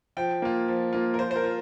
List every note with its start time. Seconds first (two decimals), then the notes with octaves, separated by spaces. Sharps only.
0.17 F3 G5
0.42 A#3 F4
0.68 F3
0.93 A#3 F4
1.14 A#4
1.19 F3 C5
1.31 C5
1.36 A#4
1.44 F4